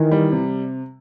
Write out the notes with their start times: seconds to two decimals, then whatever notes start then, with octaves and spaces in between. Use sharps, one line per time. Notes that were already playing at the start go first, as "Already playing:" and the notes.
Already playing: D#3 E3
0.12 G3
0.32 C3